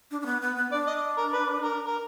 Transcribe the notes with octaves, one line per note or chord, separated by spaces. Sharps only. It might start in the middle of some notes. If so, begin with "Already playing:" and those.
D4
D4
B3
B3
B3
D4 D5
D#5
A#4
B4
A#4
A#4